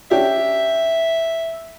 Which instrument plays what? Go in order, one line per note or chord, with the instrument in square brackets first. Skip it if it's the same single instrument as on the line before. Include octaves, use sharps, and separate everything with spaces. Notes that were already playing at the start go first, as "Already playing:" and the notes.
[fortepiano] C#4 D4 G4 [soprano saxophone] E5